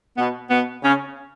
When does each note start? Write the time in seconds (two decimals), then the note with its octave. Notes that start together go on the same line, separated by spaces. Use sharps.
0.18 B2 B3
0.50 B2 B3
0.83 C#3 C#4